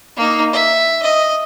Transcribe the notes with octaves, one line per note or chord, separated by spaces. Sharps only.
A#3 D#4
E5
D#5